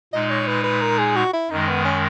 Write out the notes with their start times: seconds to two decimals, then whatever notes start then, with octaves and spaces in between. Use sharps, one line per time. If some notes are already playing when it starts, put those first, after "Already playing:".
0.13 A#2 G#3 D#4 D#5
0.30 C#5
0.47 B4
0.64 B4
0.82 A#4
0.99 G#4
1.16 F#4
1.33 E4
1.50 F#2 D#3 G#3 D#4
1.68 B3
1.85 C#4